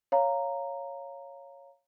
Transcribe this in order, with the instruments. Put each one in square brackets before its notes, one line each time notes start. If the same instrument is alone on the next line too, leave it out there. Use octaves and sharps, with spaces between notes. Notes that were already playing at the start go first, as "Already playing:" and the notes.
[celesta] C#5 F5 A#5